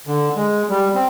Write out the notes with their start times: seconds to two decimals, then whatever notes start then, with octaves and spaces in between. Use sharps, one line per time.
0.07 D3
0.36 G#3
0.69 G3
0.95 C4